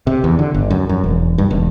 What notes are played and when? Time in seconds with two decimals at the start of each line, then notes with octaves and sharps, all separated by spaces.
0.07 C3
0.24 E2
0.39 D3
0.54 G1
0.70 F#2
0.89 F#2
1.04 E1
1.38 G2
1.51 E1